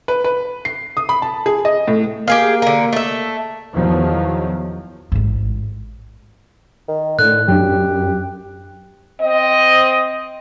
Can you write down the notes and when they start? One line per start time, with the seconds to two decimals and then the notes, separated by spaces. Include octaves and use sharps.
0.08 B4
0.24 B4
0.65 C7
0.97 D#6
1.09 B5
1.22 A5
1.46 G#4
1.65 D#5
1.88 A2
2.28 A#3 G4 G#4 F5
2.62 D3 A#4
2.93 A3 E5
3.74 E2 D#3 F3 F#3
5.12 A1 G#2
6.88 D#3
7.19 A2 D3 F#6
7.48 F#2 F#3 D4 G4
9.21 C4 D#5